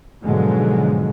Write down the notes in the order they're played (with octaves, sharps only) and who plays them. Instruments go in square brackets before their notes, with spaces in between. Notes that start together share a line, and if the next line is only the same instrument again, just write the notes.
[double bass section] G#2 B2 D3 F3 F#3 G#3